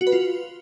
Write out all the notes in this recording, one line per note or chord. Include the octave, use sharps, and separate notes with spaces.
F#4
B4
F4